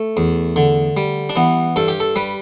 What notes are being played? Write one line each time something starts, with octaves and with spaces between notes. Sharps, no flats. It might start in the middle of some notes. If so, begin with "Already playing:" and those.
Already playing: A3
E2
D3
G3
D4
E3 B3
G2 A4
G4
A4
G3 B4